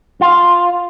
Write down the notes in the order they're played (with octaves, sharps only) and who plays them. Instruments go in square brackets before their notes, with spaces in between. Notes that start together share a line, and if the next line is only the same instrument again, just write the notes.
[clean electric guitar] F4